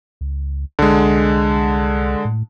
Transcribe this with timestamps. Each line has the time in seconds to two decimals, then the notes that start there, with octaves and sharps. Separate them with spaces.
0.21 C#2
0.79 C2 D3 G#3
2.25 A2